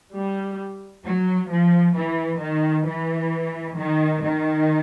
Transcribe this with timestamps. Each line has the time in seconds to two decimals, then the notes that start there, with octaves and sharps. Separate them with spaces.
0.14 G3
1.05 F#3
1.50 F3
1.96 E3
2.41 D#3
2.87 E3
3.78 D#3
4.23 D#3